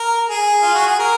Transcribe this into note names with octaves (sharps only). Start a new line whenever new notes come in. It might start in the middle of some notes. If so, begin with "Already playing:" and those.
Already playing: A#4
G#4
F4
F#4
G#4
A#4